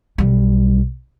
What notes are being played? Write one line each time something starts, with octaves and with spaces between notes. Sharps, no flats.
B1 G3